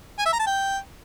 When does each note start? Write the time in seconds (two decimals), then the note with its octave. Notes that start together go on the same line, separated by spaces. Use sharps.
0.19 G#5
0.26 E5
0.33 A#5
0.40 A5
0.47 G5